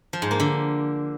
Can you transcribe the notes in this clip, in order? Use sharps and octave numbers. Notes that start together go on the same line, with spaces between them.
F3
G#2
A#3
D3